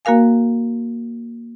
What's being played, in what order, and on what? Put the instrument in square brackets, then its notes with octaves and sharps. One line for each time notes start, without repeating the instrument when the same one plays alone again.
[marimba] A#3 F#4 A#4 F5 G#5